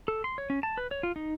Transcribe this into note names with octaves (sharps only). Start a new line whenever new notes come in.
A4
C6
C#5
C#4
A5
B4
C#5
F4
D#4